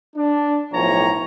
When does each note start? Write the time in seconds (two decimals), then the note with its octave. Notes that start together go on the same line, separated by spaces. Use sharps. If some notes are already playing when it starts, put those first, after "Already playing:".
0.16 D4
0.73 B1 A2 F3 C#5 A#5